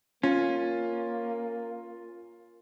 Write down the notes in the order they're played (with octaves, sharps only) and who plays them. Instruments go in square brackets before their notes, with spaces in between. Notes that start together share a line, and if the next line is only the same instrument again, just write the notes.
[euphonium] A#3 [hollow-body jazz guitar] C#4 [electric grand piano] F4